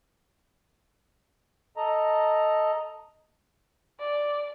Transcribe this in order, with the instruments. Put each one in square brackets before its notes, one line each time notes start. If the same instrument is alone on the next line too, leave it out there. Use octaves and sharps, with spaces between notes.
[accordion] A4 D#5 A#5
[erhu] D5